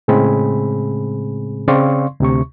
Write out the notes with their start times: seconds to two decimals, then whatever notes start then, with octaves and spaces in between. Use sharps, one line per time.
0.08 A2 C#3 G#3 C4 G#4 B5
1.68 C#3 C4 D5 F5 C6 C#6
2.20 D2 C3 C#6